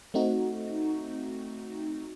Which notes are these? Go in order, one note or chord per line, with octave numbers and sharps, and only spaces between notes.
A3 C4 D#4 F#4